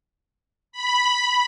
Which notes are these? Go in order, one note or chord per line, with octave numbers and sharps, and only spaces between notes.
B5